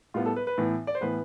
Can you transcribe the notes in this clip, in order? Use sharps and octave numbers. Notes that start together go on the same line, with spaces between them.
A2 G3 B3 F4
A4
B4
B4
A2 E3 B3
D5
C5
A2 E3 B3 B4